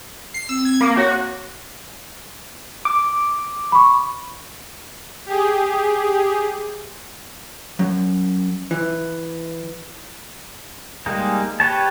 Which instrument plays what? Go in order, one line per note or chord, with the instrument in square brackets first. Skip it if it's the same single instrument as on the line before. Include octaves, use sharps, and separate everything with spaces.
[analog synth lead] C7
[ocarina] C4 [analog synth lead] E6
[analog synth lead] G#6
A#3
[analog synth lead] F#4 [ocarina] C#5
[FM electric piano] D6
[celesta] B5 C#6
[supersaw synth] G4 G#4
[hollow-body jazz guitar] F#2
E3
[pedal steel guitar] G3 G#3 A#3 D#4
G4 B4 C#5 A5